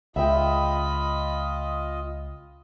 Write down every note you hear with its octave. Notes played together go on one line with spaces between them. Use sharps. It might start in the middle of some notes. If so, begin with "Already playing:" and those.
C#2 F4 D#5 E5 G5 B5